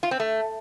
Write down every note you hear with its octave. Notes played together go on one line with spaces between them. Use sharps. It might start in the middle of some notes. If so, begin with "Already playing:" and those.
F4
C4
A3